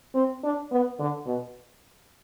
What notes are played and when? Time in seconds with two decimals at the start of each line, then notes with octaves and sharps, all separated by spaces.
0.14 C4
0.43 D4
0.71 B3
0.99 D3
1.26 B2